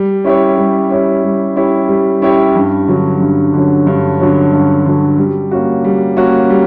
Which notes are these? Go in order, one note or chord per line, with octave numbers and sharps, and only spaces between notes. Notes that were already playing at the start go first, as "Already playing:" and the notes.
Already playing: G3
C#4 E4 G4 C#5
G3
C#4 E4 G4 C#5
G3
C#4 E4 G4 C#5
G3
C#4 E4 G4 C#5
G2
D3 F#3 C#4
G2
D3 F#3 C#4
G2
D3 F#3 C#4
G2
D3 F#3 C#4
G3
A#3 C#4 F#4
G3
A#3 C#4 F#4
G3